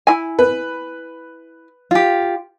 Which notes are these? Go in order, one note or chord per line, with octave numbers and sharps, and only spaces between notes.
E4 G#5
B4
F4 G4